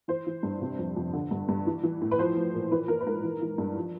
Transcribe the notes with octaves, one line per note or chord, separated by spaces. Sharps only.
E3 C5
E3
G2
C3
F2
F2
D3
G2
G2
E3
E3
A2
B4
F3 C5
F3
A#2
E3 B4
E3 A#4
B4
G#2 A#4
E3
E3
G2
F3